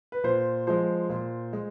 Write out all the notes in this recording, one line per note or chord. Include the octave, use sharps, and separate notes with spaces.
B4
A#2 C5
F3 G#3 C5
A#2
G#3